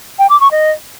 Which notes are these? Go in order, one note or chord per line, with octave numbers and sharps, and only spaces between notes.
G5
D6
C#6
D#5